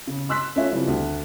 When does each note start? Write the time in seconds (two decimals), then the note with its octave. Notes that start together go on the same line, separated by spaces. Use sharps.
0.07 C#3
0.29 C6 E6 F#6 B6
0.56 A3 C#4 F4 D5 E5
0.71 C#3 E3 F3 G3 C4
0.87 D2